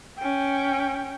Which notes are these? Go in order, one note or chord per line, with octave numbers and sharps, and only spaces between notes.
C#4 G5